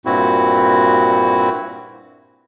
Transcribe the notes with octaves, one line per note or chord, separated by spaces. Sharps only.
G2 A#2 C4 E4 F#4